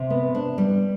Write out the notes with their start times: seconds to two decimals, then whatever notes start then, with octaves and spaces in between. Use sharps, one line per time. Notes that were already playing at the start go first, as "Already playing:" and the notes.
Already playing: C3
0.10 B3
0.35 D4
0.58 G3